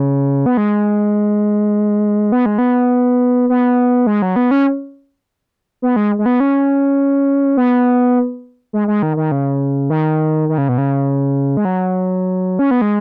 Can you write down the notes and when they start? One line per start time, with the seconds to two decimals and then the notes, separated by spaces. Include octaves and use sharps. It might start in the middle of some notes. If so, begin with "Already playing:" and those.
Already playing: C#3
0.46 B3
0.57 G#3
2.32 B3
2.46 G#3
2.58 B3
3.49 B3
4.07 G#3
4.22 F#3
4.36 B3
4.51 C#4
5.82 B3
5.96 G#3
6.19 G#3
6.26 B3
6.40 C#4
7.57 B3
8.73 G#3
8.88 G#3
9.03 D#3
9.17 D#3
9.32 C#3
9.90 D#3
10.49 D#3
10.58 C#3
10.69 B2
10.78 C#3
11.57 G#3
11.65 F#3
12.59 C#4
12.71 B3
12.81 G#3